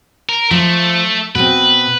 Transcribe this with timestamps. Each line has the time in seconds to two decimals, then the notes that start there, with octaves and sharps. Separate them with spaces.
0.29 A#4
0.51 F3 A3
1.35 B2 C4 B4